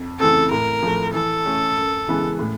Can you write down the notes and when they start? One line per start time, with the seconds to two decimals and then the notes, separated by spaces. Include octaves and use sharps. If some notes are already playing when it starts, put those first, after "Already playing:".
Already playing: F2
0.20 C#3 E3 A3 C4 A4
0.51 A2 A#4
0.82 F3 A3
1.13 E3 A4
1.46 A3 C#4
1.77 F#2
2.07 C#3 E3 G#3 B3
2.39 A2